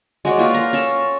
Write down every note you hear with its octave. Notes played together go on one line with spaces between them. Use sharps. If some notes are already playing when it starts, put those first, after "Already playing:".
G#3 F#4 C#5 D5
A#3 F4 B4
A#4 A#5
C#4 A4 A5